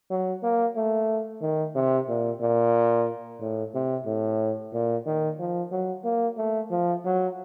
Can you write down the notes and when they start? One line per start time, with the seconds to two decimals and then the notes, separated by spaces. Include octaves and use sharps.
0.10 F#3
0.43 A#3
0.76 A3
1.41 D#3
1.75 C3
2.08 A#2
2.41 A#2
3.40 A2
3.74 C3
4.06 A2
4.73 A#2
5.06 D#3
5.39 F3
5.72 F#3
6.05 A#3
6.37 A3
6.71 F3
7.05 F#3